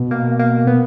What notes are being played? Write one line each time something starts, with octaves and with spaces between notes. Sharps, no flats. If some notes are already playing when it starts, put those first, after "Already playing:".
Already playing: B2
A#3
A#3
B3